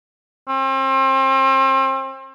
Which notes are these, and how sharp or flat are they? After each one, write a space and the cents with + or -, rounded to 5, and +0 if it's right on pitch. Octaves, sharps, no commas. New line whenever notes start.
C4 +35